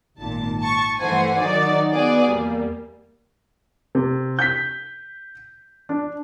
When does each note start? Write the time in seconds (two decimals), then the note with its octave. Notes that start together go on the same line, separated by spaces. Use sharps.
0.18 G#1 A#2 A5
0.60 A5 C#6
0.98 G2 E3 A3 C5 F#5 G#5
1.38 D#3 F#3 D#4 F#4 D5
1.91 B3 F#4 G#4 D5
2.26 E2 G3 A#3
3.95 C3
4.39 G6 B6
5.89 D4